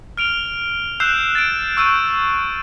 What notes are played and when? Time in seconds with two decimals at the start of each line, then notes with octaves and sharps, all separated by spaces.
0.17 F6 D7 F7 G7
1.00 E6 F#6 G6 C7 E7
1.35 A6 D7
1.77 C#6 E6 G6 D#7